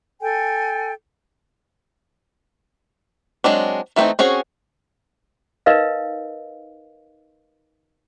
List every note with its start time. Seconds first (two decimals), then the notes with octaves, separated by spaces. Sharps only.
0.21 A4 G5 G#5
3.44 F#3 G#3 C4 D4
3.96 E3 A3 B3 C4 D#4
4.19 C4 C#4 F#4 G#4
5.66 D#4 A#4 B4 D#5 F5